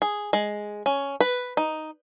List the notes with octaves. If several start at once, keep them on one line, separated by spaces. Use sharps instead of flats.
G#4
G#3
C#4
B4
D#4